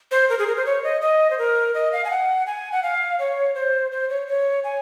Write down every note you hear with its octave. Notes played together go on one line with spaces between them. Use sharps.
C5
A#4
G#4
A#4
C5
C#5
D#5
D#5
C5
A#4
D#5
F5
G#5
F#5
G#5
F#5
F5
C#5
C5
C5
C#5
C#5
G#5